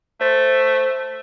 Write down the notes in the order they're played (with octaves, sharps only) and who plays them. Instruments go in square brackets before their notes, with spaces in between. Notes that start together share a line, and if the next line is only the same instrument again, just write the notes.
[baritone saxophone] A3 [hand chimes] C5 A6